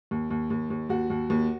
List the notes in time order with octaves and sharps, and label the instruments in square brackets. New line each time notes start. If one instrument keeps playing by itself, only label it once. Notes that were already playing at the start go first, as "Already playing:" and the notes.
[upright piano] D#2
D#2
D#2
D#2
D#2 F#4
D#2
D#2